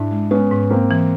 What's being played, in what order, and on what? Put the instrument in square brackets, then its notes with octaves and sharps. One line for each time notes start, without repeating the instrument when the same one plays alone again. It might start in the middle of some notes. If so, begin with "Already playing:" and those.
Already playing: [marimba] G#2 [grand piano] D4 E4
[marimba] G#3
[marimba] G#3 [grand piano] B3 C#4
[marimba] G#2
[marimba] G#2 [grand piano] A#3 C4
[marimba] E3